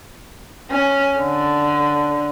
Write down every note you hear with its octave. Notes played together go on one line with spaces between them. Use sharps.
C#4
D3